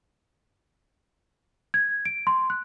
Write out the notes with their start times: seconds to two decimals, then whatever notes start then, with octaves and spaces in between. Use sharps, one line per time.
1.74 G#6
2.05 D7
2.27 C6
2.50 F#6